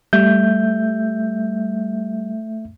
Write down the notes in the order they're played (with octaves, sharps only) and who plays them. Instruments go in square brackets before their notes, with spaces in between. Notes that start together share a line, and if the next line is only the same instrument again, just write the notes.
[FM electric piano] G3 [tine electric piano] A3 E5 G6